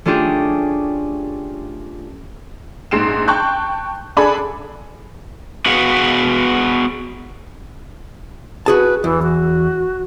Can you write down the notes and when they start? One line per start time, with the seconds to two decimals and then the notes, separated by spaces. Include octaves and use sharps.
0.05 A3 C#4 D4 F4 G4 G#4
2.91 A#1 G#2 C7 D7 E7
3.28 G5 A5 C#6 F#6 G6
4.17 D4 G#4 A4 D5 G#5 B5
5.66 B3 F#4 G#4 B4 F5 F#5
8.66 F#4 G#4 B4 A5
9.04 E2 E3
9.23 F#4